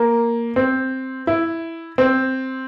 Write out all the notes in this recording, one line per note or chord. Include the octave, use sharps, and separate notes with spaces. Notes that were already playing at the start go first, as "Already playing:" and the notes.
Already playing: A#3
C4
E4
C4